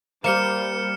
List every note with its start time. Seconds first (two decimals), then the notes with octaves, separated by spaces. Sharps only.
0.24 G3 A#3 C5 F6 C#7 E7